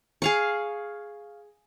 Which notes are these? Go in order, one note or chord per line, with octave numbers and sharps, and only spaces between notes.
G#4 F5 C#6